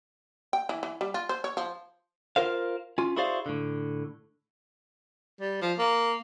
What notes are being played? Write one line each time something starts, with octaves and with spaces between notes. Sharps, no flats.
G5
E3
E3
G3
F4
C5
C#5
F3
F4 A#4 C5 F5
C#4 F4
E4 F#4 G#4 C5 D5 F5
A2 D3
G3
F3
A#3